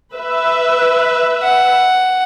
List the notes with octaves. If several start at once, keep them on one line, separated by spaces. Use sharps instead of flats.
B4 E5
F#5